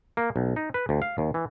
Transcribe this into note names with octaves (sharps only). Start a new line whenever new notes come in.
A#3
B1
D#4
B4
D2
F5
D#2
E3